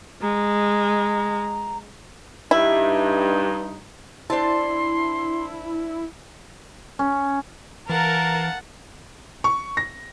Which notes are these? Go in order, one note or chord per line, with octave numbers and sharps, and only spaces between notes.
G#3 A#5
G2 D#4 E4
D4 E4 C5 A5 C6
C#4
E3 A#4 F5 F#5 A5
C#6
A#6